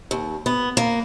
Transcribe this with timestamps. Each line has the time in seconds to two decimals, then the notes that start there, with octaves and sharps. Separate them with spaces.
0.11 D#2
0.46 B3
0.77 A#3